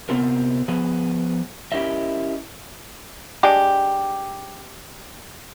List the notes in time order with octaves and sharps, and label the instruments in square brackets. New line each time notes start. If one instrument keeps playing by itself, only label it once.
[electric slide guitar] C3 D#3 B3 C4 F4 A#4
F3 B3 G#4 B4
C#4 E4 G4 A#4 D#5 E5
[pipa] G#3 D4 G4